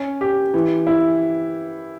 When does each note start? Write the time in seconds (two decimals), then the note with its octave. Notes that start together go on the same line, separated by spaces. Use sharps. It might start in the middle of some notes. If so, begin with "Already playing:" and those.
Already playing: C#4
0.21 G4
0.54 E3
0.87 E4